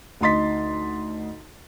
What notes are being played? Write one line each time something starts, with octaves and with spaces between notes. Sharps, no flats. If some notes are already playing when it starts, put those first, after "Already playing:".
D2 D#4 D#5 C6 A6 B6